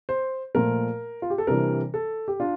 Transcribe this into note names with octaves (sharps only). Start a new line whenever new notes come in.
C5
A#2 F3 A3 A#4
F4
G4
A4
C3 E3 G3 D4 A#4
A4
G4
D4 F4